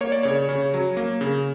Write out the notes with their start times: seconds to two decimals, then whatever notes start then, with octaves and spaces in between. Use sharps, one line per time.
0.01 A#3 C#5
0.12 D5
0.23 C#3 C#5
0.49 C#3
0.74 F#3
0.97 A#3
1.21 C#3